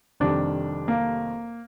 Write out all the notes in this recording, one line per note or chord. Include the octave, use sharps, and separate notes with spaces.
F1 F2 D#3 G3 D4
A#3